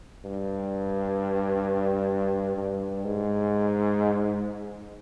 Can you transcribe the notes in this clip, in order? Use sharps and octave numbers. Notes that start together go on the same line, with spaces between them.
G2
G2
G#2